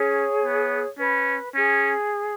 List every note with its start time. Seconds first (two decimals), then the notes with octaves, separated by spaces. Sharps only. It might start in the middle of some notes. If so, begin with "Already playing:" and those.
Already playing: C#4 G#4 C#5
0.43 B3
0.99 C#4 B4
1.55 C#4 G#4